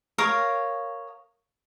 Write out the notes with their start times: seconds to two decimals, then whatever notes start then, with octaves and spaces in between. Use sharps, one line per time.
0.18 A#4 C#5 F5 D#6